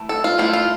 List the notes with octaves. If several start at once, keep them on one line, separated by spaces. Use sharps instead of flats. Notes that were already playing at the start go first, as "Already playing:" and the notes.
Already playing: E3 A3
A4
F4
E3 A3 E4 F4
F4